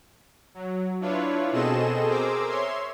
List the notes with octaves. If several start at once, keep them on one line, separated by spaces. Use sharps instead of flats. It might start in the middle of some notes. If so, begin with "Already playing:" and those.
F#3
D4 E4 F4 B4 C#5
B2 C4 G#4 A4 D#5 E7
G#4 A#4 C5 D6 E6
C#5 E5 C6